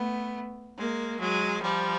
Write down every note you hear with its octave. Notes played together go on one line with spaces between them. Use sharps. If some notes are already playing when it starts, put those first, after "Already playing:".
Already playing: A3 B3
G#3 A#3
F#3 G#3
F3 G3